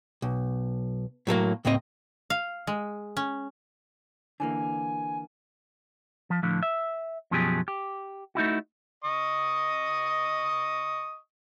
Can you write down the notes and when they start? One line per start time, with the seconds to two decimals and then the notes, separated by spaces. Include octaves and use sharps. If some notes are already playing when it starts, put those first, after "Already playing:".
0.22 B1
1.27 A2 F#3 A3 A#3
1.65 C#2 A2 A#3 C4 D#5
2.30 F5
2.67 G#3
3.17 C#4
4.40 D3 E3 A#3 G#5
6.30 F3
6.43 A2 D3 F3
6.63 E5
7.31 F#2 B2 F3 F#3 G4 G#4
7.68 G4
8.35 A3 D#4 E4 F#4
9.04 D#5 C#6 D#6